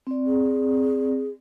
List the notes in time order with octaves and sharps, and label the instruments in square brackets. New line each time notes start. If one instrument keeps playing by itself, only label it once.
[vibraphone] C4 D5
[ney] G#4